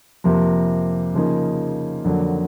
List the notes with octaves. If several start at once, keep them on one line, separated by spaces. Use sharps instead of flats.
F2 C3 F3 A#3
C#3 F3 A#3 D#4 G#4
F2 D3 F#3 A#3